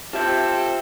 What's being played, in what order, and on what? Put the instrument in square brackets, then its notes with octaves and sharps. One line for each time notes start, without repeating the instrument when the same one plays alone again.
[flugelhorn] C4 [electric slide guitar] F4 E5 [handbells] G4 G6 [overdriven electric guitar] A4